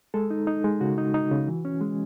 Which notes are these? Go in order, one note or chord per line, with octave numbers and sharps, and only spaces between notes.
G#3 A4
D#4
D#4
G#3
C#3 F#4
D#4
D#4
C#3
E3
C#4
G#3